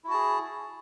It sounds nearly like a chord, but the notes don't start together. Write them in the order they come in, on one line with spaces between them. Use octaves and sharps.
E4 F#4 A5 G#4